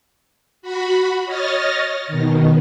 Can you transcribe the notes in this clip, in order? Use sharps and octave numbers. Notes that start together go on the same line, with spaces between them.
F#4 B5
C#5 D#5 F6 A6 A#6
B2 D#3